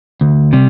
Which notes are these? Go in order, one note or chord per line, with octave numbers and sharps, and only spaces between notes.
D2
C3 G3